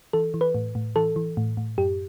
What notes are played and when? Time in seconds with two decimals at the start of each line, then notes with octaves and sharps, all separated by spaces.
0.13 E3 A4
0.34 E3
0.41 B4
0.55 A2
0.75 A2
0.96 E3 A4
1.16 E3
1.37 A2
1.57 A2
1.78 F#2 G4